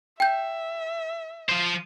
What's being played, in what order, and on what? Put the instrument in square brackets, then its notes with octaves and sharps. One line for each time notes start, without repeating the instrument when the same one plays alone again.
[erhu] E5 [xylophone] G5 G6
[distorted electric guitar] F3 C5